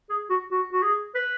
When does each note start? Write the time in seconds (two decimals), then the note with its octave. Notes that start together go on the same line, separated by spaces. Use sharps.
0.09 G#4
0.30 F#4
0.51 F#4
0.72 F#4
0.83 G#4
1.15 B4